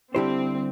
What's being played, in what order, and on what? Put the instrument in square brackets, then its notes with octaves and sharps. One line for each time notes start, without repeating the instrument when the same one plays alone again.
[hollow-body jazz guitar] D3 G3 E4 G4 C5 [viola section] C4